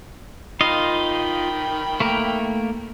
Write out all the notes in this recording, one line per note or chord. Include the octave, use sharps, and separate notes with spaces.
D#3 F4 D#5 F5 G5 B5
A3 A#3 A#4